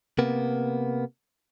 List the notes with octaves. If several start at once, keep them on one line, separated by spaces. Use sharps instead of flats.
C3 A#3 B3